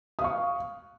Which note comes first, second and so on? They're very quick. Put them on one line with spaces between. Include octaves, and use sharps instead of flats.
D#6 F5 C#6